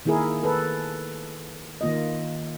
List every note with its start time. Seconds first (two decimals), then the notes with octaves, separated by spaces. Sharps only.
0.06 D#3 A#3 E4 G#4 A#4
0.43 A4 B4
1.81 D#3 A#3 F4 D#5